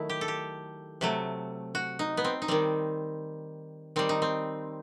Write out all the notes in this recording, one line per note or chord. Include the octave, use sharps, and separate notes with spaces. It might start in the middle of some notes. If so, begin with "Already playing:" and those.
Already playing: D#3 F#3 A3 E4
G4
A4
G4
C3 F#3 A3
F#4
D#4
B3
C4
D#4
D#3 G3 C4
D#3 G3 C4
D#4
C4